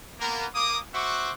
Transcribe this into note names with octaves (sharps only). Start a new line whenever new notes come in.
A#3 B3 A#4
A#3 D6 D#6
F#4 C5 E5 F#5 C#6 D6